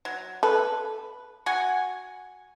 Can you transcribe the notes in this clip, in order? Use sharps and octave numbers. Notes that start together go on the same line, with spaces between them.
F#3
A4 B4
F#4 F#5 G#5